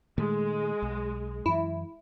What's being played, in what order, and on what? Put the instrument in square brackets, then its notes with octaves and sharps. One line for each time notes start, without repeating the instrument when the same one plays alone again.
[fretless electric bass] A#2 D#3 A3 [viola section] G#3
[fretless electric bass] B1
[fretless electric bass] F#2 E3 [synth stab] E4